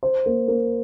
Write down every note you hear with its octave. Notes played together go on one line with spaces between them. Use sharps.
C5
A#3
A#3